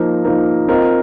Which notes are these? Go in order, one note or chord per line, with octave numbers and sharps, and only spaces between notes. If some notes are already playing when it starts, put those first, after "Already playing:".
Already playing: F3 A#3 D#4 A#4
F3 A#3 D#4 A#4
C4 F4 A#4 D#5